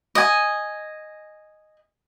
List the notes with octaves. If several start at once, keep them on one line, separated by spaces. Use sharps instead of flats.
D#5 G#5